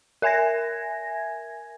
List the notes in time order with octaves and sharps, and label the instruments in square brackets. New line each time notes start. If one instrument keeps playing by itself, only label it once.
[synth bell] A#4 E5 G#5 G#6 A#6